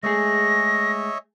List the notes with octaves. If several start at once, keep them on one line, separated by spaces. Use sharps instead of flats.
G#3 A3 G#4 C#5 D#5 E5 A#6